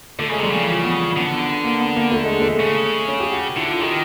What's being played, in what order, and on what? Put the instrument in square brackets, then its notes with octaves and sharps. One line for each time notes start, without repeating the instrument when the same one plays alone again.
[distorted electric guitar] D3 [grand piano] A3
[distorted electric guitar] C#3 [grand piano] G#3
[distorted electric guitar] C3 [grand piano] G3
[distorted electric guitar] C#3
[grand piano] G3
E3
F3
B3
B3
[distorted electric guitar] D3 [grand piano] B3
[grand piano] A#3
B3
A#3
A3
G#3
A3
G#3
[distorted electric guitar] C#3
[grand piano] C#4
G4
F#4
[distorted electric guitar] D3 [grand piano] E4
[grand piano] F4
[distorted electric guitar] D#3 [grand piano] G4